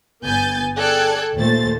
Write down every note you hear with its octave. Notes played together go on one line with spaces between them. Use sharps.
G1 B3 G#5 G6 A6
G#4 A4 D5 G5 F#6 G#6
D#2 A#2 A3 C5 A6